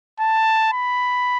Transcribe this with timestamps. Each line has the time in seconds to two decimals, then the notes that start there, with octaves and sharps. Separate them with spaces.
0.20 A5
0.73 B5